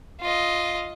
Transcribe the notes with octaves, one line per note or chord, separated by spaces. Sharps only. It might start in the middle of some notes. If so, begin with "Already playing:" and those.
F4 D#5